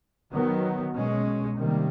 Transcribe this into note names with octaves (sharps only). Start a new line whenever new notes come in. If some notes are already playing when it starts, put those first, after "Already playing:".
D#3 F#3 B3
B2 G#3 C#4
C3 D#3 G3 A#3